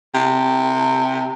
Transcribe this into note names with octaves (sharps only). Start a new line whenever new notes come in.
C3